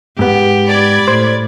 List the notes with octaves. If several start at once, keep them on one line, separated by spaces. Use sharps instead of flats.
G#2 B3 G4
D5 B5 G#6
A2 C5